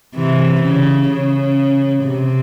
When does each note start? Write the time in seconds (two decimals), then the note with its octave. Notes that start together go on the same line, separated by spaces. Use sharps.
0.14 C3 E3
0.62 C#3
1.09 C#3
2.03 C3